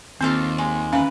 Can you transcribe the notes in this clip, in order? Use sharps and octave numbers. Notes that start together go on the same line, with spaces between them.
D#2 C4 F4 A4 C5
G#3
E3 C#4 B4 F5